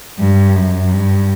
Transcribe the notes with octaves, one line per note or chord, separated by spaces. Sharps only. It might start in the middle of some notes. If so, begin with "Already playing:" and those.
G2
F#2
G2